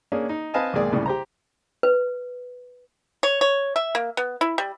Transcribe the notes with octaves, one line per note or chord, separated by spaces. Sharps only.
A#3 C#4 D4 G#4
D#4
C4 B4 D#5 F5 G#5 A5
B1 G#2 D#3 A#3 G#4 D5
C2 A2 C#3 D5
G4 C5 A#5
B4
C#5
C#5
E5
A#3
B3
E4
G3